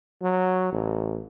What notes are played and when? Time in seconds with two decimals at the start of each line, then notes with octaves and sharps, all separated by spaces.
0.22 F#3
0.72 A1